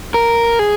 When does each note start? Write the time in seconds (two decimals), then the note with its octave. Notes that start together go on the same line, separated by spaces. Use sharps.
0.14 A#4
0.59 G#4